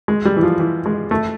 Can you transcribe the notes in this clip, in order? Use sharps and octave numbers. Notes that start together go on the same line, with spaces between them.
G#3
G3
E3
F3
E3
G#3
A3